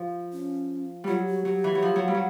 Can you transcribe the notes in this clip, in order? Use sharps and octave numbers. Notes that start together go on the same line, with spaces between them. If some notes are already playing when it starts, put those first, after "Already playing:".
Already playing: F3
C#4
F#3 G3 F4
F#4
F#3 G4
E3
F#3
F3
F#3
G3
F#3